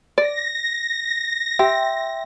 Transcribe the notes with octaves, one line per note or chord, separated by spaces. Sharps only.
D5 A#6
G4 E5 G5 C6